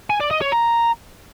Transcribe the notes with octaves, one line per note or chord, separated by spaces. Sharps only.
G#5
D5
D#5
C#5
A#5